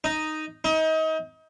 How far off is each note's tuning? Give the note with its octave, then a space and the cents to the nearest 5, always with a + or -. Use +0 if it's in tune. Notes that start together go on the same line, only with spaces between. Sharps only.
D#4 -5
D#4 +30